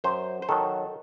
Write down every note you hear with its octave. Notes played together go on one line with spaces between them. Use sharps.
F#2 C5
C5
D#3 F#3 A4